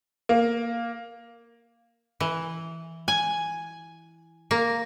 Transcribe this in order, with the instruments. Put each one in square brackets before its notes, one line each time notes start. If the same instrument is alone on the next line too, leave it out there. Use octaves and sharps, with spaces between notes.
[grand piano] A#3
[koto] E3
G#5
A#3